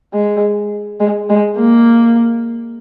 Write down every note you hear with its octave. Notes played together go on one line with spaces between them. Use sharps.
G#3
G#3
G#3
A#3